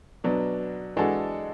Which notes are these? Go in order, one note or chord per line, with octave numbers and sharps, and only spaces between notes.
B2 F#3 B3 D4
E3 G#3 D4 F#4 A4